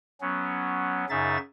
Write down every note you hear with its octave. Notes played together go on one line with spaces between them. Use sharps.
F#3 B3 C#4
F#2 C#3 D#4 G#4 E5 A6